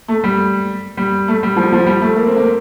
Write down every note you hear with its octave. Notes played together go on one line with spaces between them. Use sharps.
A3
G3
G3
A3
G3
F3
F3
G3
A3
A#3
C4
A#3